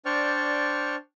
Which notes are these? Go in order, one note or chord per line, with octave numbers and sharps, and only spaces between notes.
D4 C5 D5 G5 C#6 F6